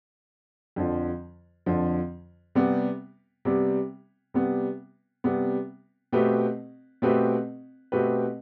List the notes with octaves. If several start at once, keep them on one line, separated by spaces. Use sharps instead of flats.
F2 D3 F3
F2 D3 F3
C3 G3 B3
C3 G3 B3
C3 G3 B3
C3 G3 B3
B2 A3 C4 G4 B4
B2 A3 C4 G4 B4
B2 A3 C4 G4 B4